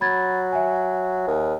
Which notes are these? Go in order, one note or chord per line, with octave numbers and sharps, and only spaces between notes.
F#3 B5 G#6 A6
E5 G#5
D#2